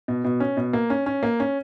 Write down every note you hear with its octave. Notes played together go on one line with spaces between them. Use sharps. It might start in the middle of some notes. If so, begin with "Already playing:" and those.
B2
B2
C#4
B2
A#3
C#4
C#4
A#3
C#4